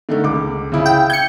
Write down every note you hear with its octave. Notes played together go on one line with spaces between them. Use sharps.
D3 D#3 A3
C#2 D6
C#3 E4
G5
G6 G#6 C#7